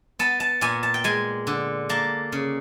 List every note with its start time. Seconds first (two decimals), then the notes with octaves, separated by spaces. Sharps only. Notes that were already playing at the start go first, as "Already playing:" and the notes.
0.19 B3 A5
0.40 A5
0.61 A#2 G#5
0.83 A5
0.94 G5
1.04 G#3 G#5
1.47 D3
1.89 A#3 A5
2.32 C#3